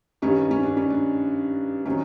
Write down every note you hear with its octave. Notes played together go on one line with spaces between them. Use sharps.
G2 D#3 G3 C#4 D#4
C#4
D4
C#4
D4
C3 D#3 F#3 C#4 D#4